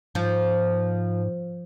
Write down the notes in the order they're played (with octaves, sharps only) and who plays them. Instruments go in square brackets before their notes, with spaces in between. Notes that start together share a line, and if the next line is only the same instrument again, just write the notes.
[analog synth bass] G#2 [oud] F3